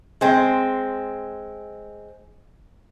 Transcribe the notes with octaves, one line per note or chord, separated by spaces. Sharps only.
G#3 C4